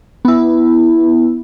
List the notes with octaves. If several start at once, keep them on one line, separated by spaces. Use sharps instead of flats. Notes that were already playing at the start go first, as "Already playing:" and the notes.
B3 E4